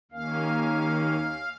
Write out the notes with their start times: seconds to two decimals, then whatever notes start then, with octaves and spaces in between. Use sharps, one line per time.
0.12 D#2 D#3 A#3 C#4 F5